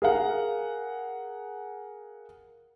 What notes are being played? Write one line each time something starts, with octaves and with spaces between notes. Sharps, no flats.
G#4 A#4 F5 F#5